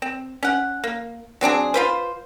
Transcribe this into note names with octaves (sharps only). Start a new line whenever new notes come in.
C4
C#4 F#5
A#3
F#3 C4 D4 G#4
F4 B4 C5